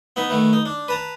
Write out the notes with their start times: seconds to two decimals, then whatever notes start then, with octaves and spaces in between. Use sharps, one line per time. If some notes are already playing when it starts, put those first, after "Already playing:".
0.16 B3 D#4 E5
0.30 D#3 A3 B3
0.53 D#4
0.65 D4
0.88 B4 A5 A#5